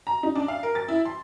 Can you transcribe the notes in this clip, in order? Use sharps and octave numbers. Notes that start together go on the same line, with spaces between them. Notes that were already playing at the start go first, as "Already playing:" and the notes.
A#5
D#4
D4
F5
A#4
A6
E4
C6